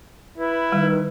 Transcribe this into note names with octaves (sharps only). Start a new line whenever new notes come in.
E4 B4
D#3 G3